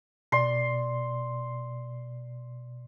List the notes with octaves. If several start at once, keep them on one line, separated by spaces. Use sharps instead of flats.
B2 D5 C6